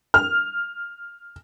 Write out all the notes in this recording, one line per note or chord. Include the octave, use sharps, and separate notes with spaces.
F6